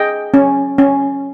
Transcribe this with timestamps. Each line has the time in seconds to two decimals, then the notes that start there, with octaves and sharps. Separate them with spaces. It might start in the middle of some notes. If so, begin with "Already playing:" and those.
Already playing: G#4 D#5 G5
0.34 C#4
0.78 C#4